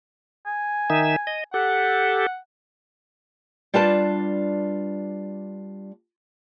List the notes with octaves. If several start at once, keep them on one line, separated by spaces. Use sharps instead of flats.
G#5
D#3 D#4 E5
D#5
G4 A4 F#5
G3 D4 F4 B4 D5 A5